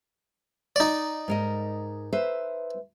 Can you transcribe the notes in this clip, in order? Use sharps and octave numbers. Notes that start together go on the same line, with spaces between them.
D#4 D5
G#2 A#4 D#5
B4 C5 E5